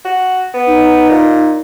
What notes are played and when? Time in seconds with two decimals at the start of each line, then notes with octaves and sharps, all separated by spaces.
0.05 F#4
0.54 B3
0.67 D#4
1.09 A#2